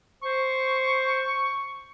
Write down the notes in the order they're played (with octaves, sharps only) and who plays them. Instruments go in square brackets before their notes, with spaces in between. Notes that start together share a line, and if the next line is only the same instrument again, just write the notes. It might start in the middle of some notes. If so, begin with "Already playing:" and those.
[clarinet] C5 [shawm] C#6